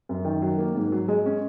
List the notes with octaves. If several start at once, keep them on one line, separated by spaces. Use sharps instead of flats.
F#2
D#3
F#3
A#3
G#2
F#3
G#3
C#4